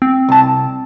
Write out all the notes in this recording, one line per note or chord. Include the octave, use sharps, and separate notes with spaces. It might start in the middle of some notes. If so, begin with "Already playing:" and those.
C4
C2 A5